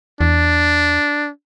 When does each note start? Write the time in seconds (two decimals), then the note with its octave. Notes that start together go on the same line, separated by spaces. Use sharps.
0.21 E2 D4